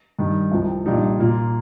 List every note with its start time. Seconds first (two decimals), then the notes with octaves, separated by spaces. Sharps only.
0.19 G2 D#3 G3
0.52 C2 C3 F3
0.86 A#1 A#2 G3 D#4
1.19 A#2 A#3 F4